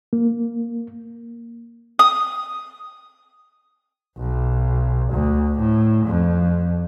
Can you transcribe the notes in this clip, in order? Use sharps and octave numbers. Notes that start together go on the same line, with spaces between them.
A#3
D#6
B1
D2
A2
F2